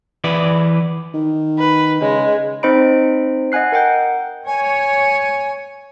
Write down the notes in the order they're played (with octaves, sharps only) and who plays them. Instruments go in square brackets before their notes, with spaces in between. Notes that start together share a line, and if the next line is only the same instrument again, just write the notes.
[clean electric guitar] E3 B4 D5
[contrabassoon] D#3
[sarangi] B4
[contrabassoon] C#3 [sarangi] G#3
[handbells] C4 D#4 C5 D#5 B5 D7
D#5 F#5 G#5 F#6 C7
A#4 F#5 G5 G6
[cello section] C#5 [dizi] G#5